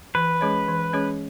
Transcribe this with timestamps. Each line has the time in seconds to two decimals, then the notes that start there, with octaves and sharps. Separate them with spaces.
0.15 E3 B4
0.41 G#3 C#4 G#4 C#5
0.68 E3
0.93 G#3 C#4 G#4 C#5